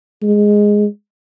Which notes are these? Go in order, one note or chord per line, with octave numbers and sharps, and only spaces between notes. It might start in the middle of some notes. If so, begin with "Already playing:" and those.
G#3